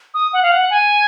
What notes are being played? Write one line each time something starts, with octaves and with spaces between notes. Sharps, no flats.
D#6
F#5
F5
F#5
G#5